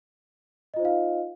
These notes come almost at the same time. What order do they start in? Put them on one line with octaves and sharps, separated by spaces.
D#5 F4 C5 D#4 F5